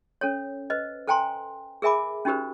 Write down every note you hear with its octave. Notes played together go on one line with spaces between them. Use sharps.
C#4 A4 C#5
B4 C5 D#5
A4 C5 G5 G#5 A#5 C6
G#4 A#4 E5 G#5 B5 D6
C#4 D#4 F#4 G4 A#4 C5